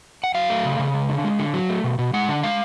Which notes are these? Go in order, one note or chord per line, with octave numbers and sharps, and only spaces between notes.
F#5
F#3 F5
A3
C#3
C#3
G#3
D3
G#3
D3
F#3
A3
B2
B2
G#3 F#5
D3
G#3 F5